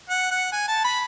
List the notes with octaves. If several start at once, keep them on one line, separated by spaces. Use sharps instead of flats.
F#5
F#5
G#5
A5
B5